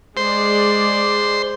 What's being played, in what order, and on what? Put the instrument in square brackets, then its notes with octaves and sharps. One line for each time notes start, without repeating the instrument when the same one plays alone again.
[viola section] G#3 D5 [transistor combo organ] C5